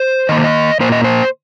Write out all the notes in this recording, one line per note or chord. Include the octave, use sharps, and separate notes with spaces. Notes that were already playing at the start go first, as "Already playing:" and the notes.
Already playing: C5
D#3 A#3 D#5
C5
D#5
A#2 A#3 C5
D#5
C5